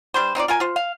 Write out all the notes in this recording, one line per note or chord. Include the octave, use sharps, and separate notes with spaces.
G3 D4 B4 C5
C4 D#4 F4 D5
F4 A#4 G#5
F4 C5
F5